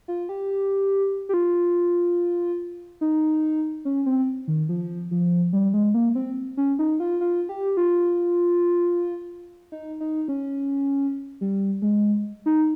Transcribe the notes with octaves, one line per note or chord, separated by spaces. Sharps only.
F4
G4
G4
F4
D#4
C#4
C4
D#3
F3
F3
G3
G#3
A#3
C4
C#4
D#4
F4
F4
G4
F4
D#4
D#4
C#4
G3
G#3
D#4